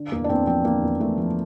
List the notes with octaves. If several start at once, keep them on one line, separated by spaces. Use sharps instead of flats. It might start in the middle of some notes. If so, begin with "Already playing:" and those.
Already playing: D3
E2 A#3
D4
E2 C4
F3 C4
D3 A#3
E2
E2 A3
F3